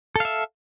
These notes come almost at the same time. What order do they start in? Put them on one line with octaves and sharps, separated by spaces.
A4 F5 E5